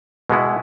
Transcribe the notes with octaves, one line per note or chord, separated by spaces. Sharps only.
B2 G#3 B3 E4